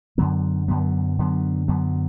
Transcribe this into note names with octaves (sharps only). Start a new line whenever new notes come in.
F#2 D3 F#3 B3
F#2 D3 F#3 B3
F#2 D3 F#3 B3
F#2 D3 F#3 B3